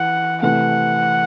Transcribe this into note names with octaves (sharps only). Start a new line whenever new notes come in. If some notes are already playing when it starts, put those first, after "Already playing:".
Already playing: E3 F#5
C3 E3 A3 F#5